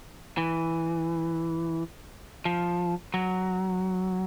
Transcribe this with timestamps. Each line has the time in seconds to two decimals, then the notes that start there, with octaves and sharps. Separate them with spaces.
0.37 E3
2.45 F3
3.14 F#3